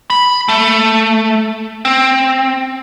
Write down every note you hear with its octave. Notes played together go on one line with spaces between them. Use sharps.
B5
A3
C4